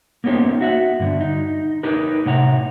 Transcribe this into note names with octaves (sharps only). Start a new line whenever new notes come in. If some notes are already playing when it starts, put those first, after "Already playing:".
A#3 B3 C#4 D#4 G4 C5
F#4 E5 F#5
G2 D3
D#4
D#4 G4 A#4 B4
A2 C3 F#5 A#5